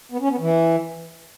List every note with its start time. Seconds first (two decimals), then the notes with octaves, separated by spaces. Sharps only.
0.12 B3
0.21 C#4
0.30 B3
0.40 E3